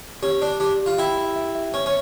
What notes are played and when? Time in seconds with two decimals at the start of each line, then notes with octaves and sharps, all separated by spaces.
0.22 C#4 G4
0.41 D4 D5
0.60 D4 G4
0.80 G4
0.86 F4
0.98 E4 G5
1.17 E5
1.36 E5
1.55 E5
1.74 C#4 C#5
1.86 C#4